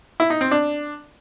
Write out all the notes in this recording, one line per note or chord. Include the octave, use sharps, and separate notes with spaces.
E4
D#4
C4
D4